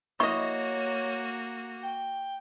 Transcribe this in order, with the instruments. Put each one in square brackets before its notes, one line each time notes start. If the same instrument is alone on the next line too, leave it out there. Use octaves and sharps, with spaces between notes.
[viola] A#3 F#4 [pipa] E4 D#5 [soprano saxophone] C#5 [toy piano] C#6
[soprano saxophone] G5